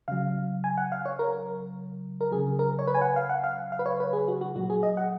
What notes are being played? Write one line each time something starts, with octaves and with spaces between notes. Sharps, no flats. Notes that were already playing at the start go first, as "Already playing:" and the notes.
C#3 F#3 F5
G#5
F#5
F5
C#5
A#4
A#4
C#3 F#3 G#4
A#4
C#5
B4
G#5
F#5
F5
F#5
F5
F5
B4
C#5
B4
G#4
F#4
F#4
A#2 F#3 F#4
G#4
D#5
F#5